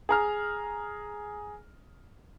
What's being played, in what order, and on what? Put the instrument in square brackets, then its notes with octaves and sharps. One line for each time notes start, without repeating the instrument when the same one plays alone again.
[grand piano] G#4 A#5 F6